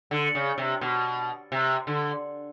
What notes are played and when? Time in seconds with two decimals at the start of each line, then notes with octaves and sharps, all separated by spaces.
0.11 D3
0.35 C#3
0.58 C3
0.81 B2
1.52 C3
1.87 D3